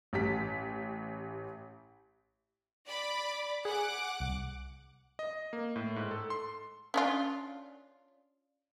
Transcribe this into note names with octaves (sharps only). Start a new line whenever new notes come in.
A1 G4 B6
D5 B5 D6
G#4 F#5 D6
C2
D#5
A#3
A2
G#2
A4
C6
C#4 D4 F4